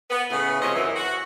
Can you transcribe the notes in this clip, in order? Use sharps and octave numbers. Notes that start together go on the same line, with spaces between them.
B3
A2 C#3 A3 B3
F2 C3 G#3 C#4 C5 D#5
F#2 E3
F#4